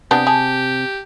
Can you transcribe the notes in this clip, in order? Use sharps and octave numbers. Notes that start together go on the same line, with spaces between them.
C3 B3 D4 G4 G#4
G#4 A5